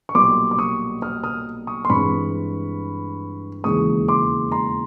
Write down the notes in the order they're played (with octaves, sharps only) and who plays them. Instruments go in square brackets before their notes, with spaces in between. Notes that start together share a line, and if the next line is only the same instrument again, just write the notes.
[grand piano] C#6
B1 A#2 G3 A#3 C6 D6
D6
C#6 D#6
D#6 F6
D#6 F6
C#6 D#6
C6
G2 E3 G#3 C4 B5 C#6
E1 D#2 C#3 E3 G#3 C#6 D#6
C6 D6
A#5 C6